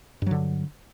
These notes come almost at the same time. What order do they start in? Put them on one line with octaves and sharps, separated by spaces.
G2 F#3 D3